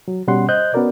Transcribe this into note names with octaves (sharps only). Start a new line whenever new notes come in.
F#3
B2 G3 C#4 F#5 C6
C5 D#5 F#6 G6
B3 C#4 F#4 A#4 D5